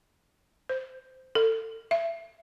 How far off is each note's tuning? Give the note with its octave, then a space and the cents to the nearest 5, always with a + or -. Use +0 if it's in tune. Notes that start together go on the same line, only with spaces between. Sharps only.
C5 -15
A4 +25
E5 +25